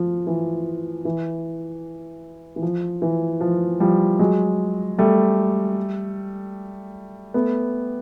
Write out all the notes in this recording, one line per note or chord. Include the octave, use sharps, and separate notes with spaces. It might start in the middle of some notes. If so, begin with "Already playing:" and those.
Already playing: F3
E3
E3
E3
F3
E3
F3
F3 G3
F#3 G#3
G3 A3
A3 B3